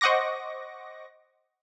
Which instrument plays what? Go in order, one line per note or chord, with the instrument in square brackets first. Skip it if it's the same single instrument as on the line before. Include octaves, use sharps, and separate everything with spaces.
[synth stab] C5 D#5 F#5 C#6 D6 A#6